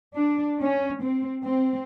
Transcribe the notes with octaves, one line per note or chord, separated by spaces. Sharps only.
D4
C#4
C4
C4